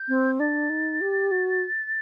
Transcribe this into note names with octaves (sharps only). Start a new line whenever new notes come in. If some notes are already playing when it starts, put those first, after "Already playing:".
Already playing: G6
C4
D4 A6
D#4
G4
F#4